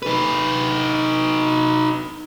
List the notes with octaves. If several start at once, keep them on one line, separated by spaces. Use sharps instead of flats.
D#4 B4